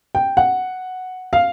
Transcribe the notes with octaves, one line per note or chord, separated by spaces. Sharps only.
G5
F#5
F5